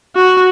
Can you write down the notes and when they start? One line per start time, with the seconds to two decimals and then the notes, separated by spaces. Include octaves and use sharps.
0.16 F#4